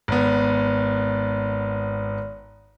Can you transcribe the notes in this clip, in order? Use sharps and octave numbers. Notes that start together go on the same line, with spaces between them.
G#1 B3